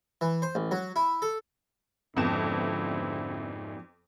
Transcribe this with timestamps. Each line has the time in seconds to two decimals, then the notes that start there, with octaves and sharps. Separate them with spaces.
0.21 E3
0.42 C5
0.55 A1
0.71 F#3
0.96 E4
1.22 A4
2.17 F2 G#2 D3 F3 B3 C4 E4 E7